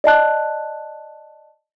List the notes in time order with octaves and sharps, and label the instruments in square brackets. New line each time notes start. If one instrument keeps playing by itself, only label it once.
[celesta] D5 D#5 A5 F#6